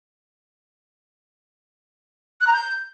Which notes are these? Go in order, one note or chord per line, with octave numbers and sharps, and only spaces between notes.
F#6
A#5
G6